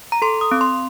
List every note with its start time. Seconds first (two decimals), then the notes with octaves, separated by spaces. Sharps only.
0.12 A#5
0.22 A4 C6
0.41 D#6
0.51 C4
0.61 C6